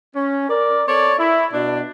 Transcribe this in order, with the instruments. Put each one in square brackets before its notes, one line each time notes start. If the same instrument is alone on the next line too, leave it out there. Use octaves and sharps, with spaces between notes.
[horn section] C#4
A#4 D5
C4 A4 C#5 D5
E4
B2 D4